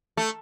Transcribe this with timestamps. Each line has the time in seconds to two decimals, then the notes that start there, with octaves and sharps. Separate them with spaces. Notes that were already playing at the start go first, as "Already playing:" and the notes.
0.17 A3